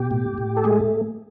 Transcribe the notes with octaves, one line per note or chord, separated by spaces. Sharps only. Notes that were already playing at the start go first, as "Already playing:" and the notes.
Already playing: B2 G4
A2
A2
A4
G#3 A3 G#4